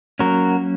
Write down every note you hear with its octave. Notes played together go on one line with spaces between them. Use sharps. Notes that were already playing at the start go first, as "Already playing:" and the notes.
F#3 A#3 C#4 F#4 A#4